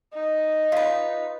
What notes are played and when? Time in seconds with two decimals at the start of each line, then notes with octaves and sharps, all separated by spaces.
0.14 D#4
0.72 F4 B4